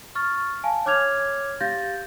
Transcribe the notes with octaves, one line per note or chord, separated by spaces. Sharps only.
C#6 F6 A6
F5 G#5 A5
C#5 D6 F6 G#6 F7
G4 F5 G6 A6 A#6